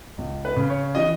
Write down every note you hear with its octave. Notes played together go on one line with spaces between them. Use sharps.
C#2
B4
C#3
C#5
E3 D#5